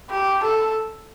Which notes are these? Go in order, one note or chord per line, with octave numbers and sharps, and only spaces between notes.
G4
A4